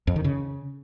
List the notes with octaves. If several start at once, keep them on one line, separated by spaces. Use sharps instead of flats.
F2
D#3
C#3